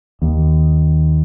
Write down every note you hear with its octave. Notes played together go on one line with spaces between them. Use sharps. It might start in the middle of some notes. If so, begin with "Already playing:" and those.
D#2